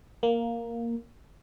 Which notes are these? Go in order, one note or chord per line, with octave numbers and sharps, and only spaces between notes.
A#3